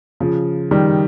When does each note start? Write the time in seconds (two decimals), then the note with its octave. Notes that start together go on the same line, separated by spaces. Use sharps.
0.20 C#3 F3
0.71 D#3 G3